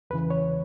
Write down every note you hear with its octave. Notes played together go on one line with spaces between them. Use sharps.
E2 C#3 E3 B4
C#5